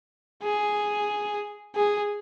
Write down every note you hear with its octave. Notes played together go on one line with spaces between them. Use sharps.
G#4
G#4